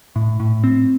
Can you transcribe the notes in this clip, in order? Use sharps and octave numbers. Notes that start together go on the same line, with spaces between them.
A2
A2
C4